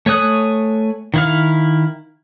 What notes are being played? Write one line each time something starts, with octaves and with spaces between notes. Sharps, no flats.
A3 C#5 G#5 D#6 F#6
D#3 E4 F5